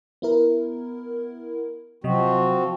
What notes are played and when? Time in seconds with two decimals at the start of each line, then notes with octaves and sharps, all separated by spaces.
0.22 B3 E4 A#4
2.04 C3 F3 F#3 C4 F#4 D#5